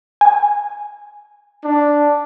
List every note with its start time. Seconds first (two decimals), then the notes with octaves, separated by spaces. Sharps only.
0.21 G#5
1.64 D4